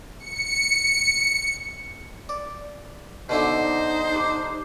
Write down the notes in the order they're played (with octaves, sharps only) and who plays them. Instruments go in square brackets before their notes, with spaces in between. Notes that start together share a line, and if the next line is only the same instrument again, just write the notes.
[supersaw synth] C#7
[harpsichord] D5
[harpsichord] B2 D3 E4 [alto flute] D#4 [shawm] C5 [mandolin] D5
[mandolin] D4 G4 D6